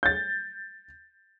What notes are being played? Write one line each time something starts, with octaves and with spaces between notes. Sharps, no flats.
G6 A6